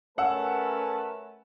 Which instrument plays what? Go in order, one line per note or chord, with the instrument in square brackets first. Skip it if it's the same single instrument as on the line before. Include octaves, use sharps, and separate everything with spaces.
[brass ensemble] A3 A#4 B4 [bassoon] C#4 [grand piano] F#5 E6 [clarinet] A5